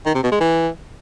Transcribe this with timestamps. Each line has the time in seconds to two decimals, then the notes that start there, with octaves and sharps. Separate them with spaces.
0.06 D#3
0.15 C3
0.23 B2
0.32 G#3
0.41 E3